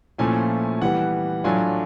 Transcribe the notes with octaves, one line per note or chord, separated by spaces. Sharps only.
A#2 F3 A3 C#4 E4 G#5
E3 G3 B3 F#5
A2 F#3 A3 D4 F4 G#5